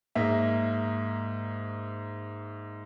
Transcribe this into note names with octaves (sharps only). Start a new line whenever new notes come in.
G#2 A#3 E5